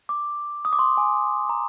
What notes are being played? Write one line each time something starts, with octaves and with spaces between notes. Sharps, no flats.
D6
D#6
D6
C6
G#5
A#5